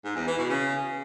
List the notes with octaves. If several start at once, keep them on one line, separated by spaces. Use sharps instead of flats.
G#2
E2
E3
B2
C#3